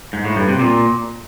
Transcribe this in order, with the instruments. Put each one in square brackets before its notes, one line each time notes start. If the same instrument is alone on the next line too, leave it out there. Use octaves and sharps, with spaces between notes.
[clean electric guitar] G#2
A2
G2
C3
A#2